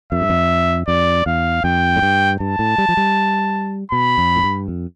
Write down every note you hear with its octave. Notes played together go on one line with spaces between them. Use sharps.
F2 E5
G2
F2
F2 D5
E2 F5
F2 G5
A2
G2
G2 A5
A2
G3
F3
G3
B2 B5
F2
A2
G2
F2